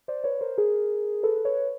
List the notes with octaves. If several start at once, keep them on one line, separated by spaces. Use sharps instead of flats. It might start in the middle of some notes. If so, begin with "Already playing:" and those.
C5 D5
B4 C#5
A#4 C5
G#4 A#4
A4 B4
B4 C#5